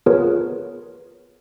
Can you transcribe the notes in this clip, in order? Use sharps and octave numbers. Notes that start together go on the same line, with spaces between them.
B3 F4 G#4 A#4 B4 C#5